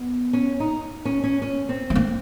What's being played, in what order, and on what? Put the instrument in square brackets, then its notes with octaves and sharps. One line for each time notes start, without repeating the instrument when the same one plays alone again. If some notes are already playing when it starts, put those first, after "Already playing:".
Already playing: [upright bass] B3
[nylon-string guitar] C#4
D#4
C#4
C#4
C#4
C4
[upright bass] A3
A#3